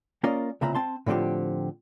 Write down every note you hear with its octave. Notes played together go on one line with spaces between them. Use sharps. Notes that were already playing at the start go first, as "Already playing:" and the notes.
A#3 C#4 F4 A#4 D5 D#5
C2 A#2 C#3 E5 A#5 B5
C4 A5 C6
A2 D3 F3 C4 G4